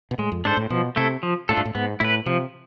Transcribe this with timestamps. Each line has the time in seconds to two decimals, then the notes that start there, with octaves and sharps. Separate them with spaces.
0.11 B2
0.18 A2 G#3
0.32 F2
0.45 G#2 D4 A4 C5
0.57 A2
0.70 B2 F3
0.96 C3 A3 E4 A4
1.23 F3
1.49 A2 A3 D4 F4 A4
1.57 G#2
1.65 A2
1.75 G#2 B3
2.00 A2 E4 B4
2.26 C3 F3